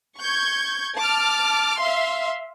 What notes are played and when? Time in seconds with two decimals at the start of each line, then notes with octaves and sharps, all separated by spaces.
0.18 C#6 G6 G#6
0.98 A5 D6 F6
1.79 E5 F5 C6